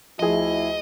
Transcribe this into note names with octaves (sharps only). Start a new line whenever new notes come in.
D2 F3 E4 G#4 D#5